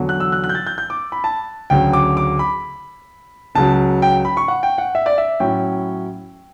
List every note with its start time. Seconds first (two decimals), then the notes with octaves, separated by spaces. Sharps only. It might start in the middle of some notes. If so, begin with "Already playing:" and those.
Already playing: E2 D3 F#3
0.09 F#6
0.20 E6
0.32 F#6
0.44 F#6
0.49 G6
0.55 A6
0.67 G6
0.78 G6
0.90 D6
1.12 B5
1.24 A5
1.70 D2 C#3 F#3 G5
1.93 D6
2.17 D6
2.39 B5
3.55 C#2 C#3 F#3 A5
4.02 G5
4.25 B5
4.37 C#6
4.48 F#5
4.63 G5
4.78 F#5
4.95 E5
5.06 D5
5.18 E5
5.40 A2 F#3 C#4 E4 G5